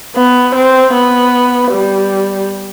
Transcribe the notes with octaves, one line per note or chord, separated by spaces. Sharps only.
B3
C4
B3
G3